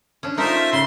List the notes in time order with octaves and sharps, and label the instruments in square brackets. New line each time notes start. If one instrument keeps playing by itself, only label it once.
[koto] C#4 D4
[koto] A3 D#4 A#4 [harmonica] F4 C5 E5
[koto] C#3 [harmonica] C6